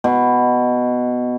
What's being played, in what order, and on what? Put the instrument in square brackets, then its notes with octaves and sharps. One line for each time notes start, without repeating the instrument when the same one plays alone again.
[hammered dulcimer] B2